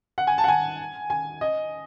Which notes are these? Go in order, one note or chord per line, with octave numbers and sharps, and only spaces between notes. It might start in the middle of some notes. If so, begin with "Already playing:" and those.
F#5
G#5
A5
F#5
G#5
G#5
D#5